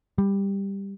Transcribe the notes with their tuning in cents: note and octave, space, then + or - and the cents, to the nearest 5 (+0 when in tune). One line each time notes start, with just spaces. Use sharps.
G3 +10